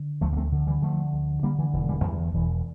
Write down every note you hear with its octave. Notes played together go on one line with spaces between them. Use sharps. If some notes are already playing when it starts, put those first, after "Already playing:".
Already playing: D3
D2 F3 A3
A#3
A3 C4
D3
E3 G3
D3 F3 A3
D2
D3 G3 A#3
E3
E1 E3
E3 G3
E2 E3 G3
E1 E3